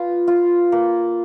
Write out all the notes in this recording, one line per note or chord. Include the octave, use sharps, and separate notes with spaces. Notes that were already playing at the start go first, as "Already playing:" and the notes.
Already playing: F4 B4
F4
A#3